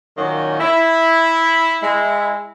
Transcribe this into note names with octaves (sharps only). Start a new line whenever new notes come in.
A#2 D#3 F#3 A#3 C#4 D#4
E4
G#3 E4